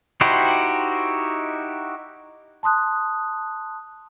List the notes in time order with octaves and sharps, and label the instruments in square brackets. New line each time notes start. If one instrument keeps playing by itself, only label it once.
[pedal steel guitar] D#4 E4 F#4 G4 C5
[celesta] A5 C6 D#6 F#6